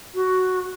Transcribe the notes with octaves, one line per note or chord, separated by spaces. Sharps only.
F#4